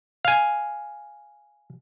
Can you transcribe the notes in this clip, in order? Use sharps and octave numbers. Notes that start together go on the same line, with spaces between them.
F5 G#5